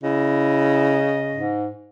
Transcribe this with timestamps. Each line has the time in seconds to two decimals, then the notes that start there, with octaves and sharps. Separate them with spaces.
0.03 C#3 E4 D#5
1.34 G#2